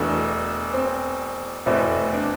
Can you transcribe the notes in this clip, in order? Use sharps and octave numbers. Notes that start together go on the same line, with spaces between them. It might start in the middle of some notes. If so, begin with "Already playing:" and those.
Already playing: E1 E2 B2 A3 D4
C4
F1 E2 B2 E3 A3 C4 E4
D4